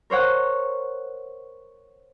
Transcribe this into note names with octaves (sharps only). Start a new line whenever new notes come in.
A#4 C5 C#5 F#5